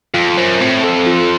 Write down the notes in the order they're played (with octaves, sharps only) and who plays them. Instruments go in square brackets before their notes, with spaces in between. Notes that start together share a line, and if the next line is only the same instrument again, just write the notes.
[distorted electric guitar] F2 [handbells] F4
[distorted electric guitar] F#2 [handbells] C5
[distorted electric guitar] A2 [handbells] C4
[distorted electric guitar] F2 [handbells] A4
[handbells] F4